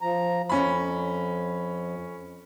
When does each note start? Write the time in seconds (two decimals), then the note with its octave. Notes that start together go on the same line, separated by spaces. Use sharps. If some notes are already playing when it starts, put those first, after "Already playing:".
0.01 F3 A#5
0.49 F2 C#4 B5